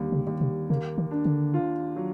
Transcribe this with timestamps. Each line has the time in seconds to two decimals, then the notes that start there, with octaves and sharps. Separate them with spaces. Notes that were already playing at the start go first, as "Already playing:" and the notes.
Already playing: D#2 D3 G3
0.12 C#3
0.27 D#2
0.41 C3
0.70 C#3 A#3
0.98 D#3
1.11 D4
1.25 D3
1.54 F4
1.96 F#3